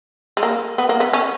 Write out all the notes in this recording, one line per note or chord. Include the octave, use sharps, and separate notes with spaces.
G#3
A#3
B3
A#3
B3
C#4